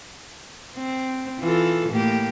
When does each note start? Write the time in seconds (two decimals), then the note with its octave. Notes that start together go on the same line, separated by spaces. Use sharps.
0.75 C4
1.40 E3 F4 A4
1.89 A2 A#3 G4